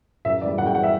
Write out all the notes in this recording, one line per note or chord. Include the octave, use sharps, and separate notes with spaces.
F#2 E5
E3 G3 D5
F#2 F#5
G5
E3 G3 F#5
E5